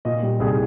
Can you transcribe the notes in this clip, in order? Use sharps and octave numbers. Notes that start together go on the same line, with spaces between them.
A#2 D#5
G3
C2 G#4